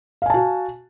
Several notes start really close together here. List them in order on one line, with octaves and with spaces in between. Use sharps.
F5 G#5 A5 F#4